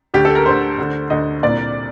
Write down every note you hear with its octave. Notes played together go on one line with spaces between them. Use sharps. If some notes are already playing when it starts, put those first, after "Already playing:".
D2 D3 G4
A4
A#4
D2 D3 C5
D2 D3
D2 D3 D#5
C2 A#2 D5